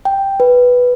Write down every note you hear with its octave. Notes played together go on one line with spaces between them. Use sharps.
G5
B4